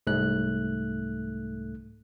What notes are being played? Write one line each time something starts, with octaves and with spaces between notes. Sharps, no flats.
C2 G#2 A3 F#6